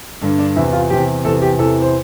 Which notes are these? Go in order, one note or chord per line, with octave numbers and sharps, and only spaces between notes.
G2 D3 D4
D4
E2 C3 E3 E4
F4
E2 C3 E3 G4
E2 C3 E3 A4
G4
E2 C3 E3 A4
C5